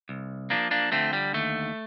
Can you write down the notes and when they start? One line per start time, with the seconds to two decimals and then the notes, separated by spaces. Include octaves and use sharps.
0.09 C2
0.50 F3 A#3 D4
0.71 A#3 D4
0.92 D3 A3 C4
1.13 G3
1.33 D#2 A3